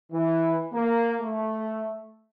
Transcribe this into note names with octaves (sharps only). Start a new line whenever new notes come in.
E3
A#3
A3